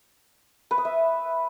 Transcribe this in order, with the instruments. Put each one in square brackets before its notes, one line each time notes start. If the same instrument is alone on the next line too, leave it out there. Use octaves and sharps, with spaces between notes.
[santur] B4
D#6
E5